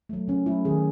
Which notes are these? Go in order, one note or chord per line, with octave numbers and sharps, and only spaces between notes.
F#3 A3
C#3 C#4
F#3 A3 E4
D#3 G#4